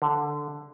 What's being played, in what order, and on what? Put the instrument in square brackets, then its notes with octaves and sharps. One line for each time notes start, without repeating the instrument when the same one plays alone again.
[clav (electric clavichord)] D3